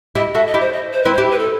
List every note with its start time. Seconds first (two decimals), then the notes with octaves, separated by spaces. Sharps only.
0.15 E4 G4 D#5
0.34 F#4 A4 E5
0.47 D#5
0.54 E4 G4
0.60 C5
0.72 D#5
0.93 C5
1.03 C4 E4 B4
1.13 C5
1.18 E4 G4
1.32 B4
1.39 A4